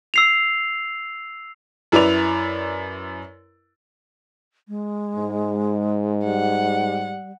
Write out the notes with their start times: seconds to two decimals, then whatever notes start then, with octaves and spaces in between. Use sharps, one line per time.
0.14 E6 C7 F7
1.92 F#2 E4 B4 D5 F7
4.68 G#3
5.16 G#2
6.25 G3 F#5